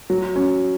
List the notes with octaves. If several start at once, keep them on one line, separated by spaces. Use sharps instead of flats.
F#3
C#4